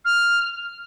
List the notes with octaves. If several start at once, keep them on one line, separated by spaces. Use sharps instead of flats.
F6